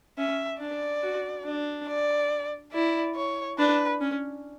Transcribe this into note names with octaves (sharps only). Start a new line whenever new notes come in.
C#4 E5
D4 D5
F#4
D4
D5
E4 D5
C#5
D4 B4
C#4